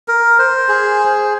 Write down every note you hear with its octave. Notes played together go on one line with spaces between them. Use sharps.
A#4
C5
G#4